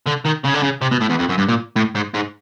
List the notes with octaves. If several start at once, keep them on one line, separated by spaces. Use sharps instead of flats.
D3
D#3
C#3
D3
C#3
C3
B2
A2
E2
F2
F#2
G2
A#2
A2
G#2
G#2